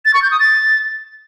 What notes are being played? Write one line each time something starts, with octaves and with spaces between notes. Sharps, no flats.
A6
C#6
G6
D#6
A6